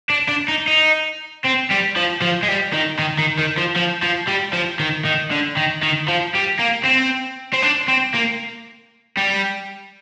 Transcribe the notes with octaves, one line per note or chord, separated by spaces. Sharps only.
D4
D4
D#4
D#4
C4
G3
F3
F3
G#3
G3
D#3
D#3
D#3
D#3
F3
F3
F3
G3
F3
D#3
D#3
D3
D#3
D#3
F3
G3
A#3
C4
C4
D4
C4
A#3
G3